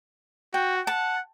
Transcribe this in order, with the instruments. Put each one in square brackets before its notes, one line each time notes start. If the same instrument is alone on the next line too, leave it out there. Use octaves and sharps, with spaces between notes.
[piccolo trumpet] F#4 [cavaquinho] G5
[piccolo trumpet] F#5 [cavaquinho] A5